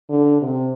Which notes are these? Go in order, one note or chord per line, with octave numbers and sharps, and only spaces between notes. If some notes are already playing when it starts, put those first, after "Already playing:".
D3
C3